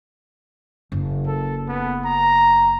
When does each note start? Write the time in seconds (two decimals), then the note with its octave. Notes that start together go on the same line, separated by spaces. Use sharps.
0.92 F#1
1.27 A4
1.68 B3
2.05 A#5